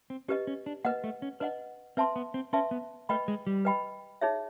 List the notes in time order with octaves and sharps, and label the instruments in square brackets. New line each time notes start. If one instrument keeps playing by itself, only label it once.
[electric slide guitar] C4
[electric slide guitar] C#4 [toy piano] G4 B4 D#5
[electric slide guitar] C#4
D4
[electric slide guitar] A#3 [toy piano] B4 D#5 F#5
[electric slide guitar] A3
C#4
[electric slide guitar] D4 [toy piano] B4 D#5 F#5
[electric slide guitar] C4 [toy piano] B4 E5 A5 C6
[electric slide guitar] B3
C4
[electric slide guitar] C#4 [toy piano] B4 E5 A5 C6
[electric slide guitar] B3
[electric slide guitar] A3 [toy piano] B4 D#5 G5 B5
[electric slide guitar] G#3
G3
[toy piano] B4 D#5 G5 B5
D#4 G#4 C#5 E5